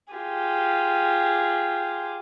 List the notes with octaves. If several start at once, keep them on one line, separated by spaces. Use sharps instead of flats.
F4 G4 G#4